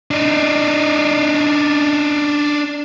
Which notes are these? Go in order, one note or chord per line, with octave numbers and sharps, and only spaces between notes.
D4 D#4